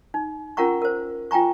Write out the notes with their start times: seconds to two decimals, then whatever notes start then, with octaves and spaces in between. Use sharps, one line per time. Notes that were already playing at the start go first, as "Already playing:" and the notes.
0.14 D#4
0.57 C#4 F4 A#4 F#5 A#5 C#6
0.82 A#4 C5
1.31 F4 G5 G#5 A#5 C#6